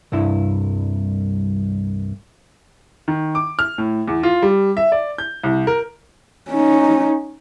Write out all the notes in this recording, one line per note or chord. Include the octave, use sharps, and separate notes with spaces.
C2 G2 E4
D#3
D6
F6
A2
E2
F4
G3
E5
D5
G6
C2
A#4
C#4 D#4